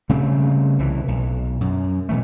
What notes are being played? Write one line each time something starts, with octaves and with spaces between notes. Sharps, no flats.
C#3 G3 A3 C4
C2 E3
B1
F#2
B2 E3 A3